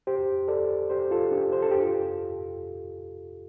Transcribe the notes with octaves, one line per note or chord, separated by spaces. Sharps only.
G4 C5
A4 D5
G4 C5
F4 A4
D4 G4
C5
A4
G4
F4 A4